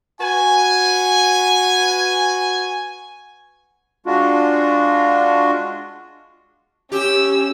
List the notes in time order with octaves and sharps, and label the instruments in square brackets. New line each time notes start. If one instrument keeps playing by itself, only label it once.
[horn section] F#4 B4 G#5
[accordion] G#3 D4 F4 F#4
[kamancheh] C#4 E6 [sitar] G4